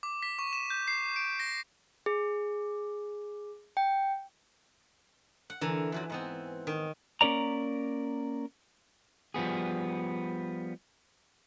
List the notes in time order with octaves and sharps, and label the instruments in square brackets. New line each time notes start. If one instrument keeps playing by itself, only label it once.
[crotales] D6
B6
C#6
E7
G6
C7
D7
A#6
[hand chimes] G#4
G5
[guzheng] F#5
[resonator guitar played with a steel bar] D3 A4 A#4 [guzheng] E3
[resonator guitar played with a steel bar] F#2 F3 F#3
G#2 B3 C4
[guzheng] D#3
[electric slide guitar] A#3 C#4 A#4 D5 A#5
[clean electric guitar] F3 G3 B3 G#4